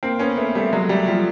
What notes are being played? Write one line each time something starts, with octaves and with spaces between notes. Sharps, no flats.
A#3 C4
B3 C#4
A3 B3
G3 A3
F#3 G#3
G3 A3
F3 G3